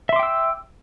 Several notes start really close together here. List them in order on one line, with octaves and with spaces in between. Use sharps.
E5 C6 D6 G5 E6